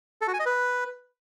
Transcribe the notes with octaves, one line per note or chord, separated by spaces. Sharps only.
A4
F#4
G#5
D#5
B4